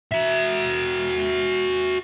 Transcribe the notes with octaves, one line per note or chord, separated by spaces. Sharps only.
F#4 E5